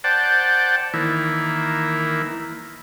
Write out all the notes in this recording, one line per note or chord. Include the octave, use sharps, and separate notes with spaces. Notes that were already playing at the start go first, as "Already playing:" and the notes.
C5 D5 F#5 G5 A5
D#3 E3 A#3 E4